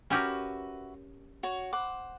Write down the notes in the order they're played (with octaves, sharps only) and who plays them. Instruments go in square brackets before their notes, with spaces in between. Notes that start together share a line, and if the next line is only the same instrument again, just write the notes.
[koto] C#4 G4 A#4 [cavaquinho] F#4 B4 E5
[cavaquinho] F#4 C#5
C5 F#5 D6